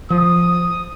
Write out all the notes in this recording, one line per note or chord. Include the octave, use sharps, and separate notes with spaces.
F3 D#6